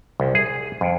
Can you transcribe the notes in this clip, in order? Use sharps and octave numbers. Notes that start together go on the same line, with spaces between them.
C2
G#4
F2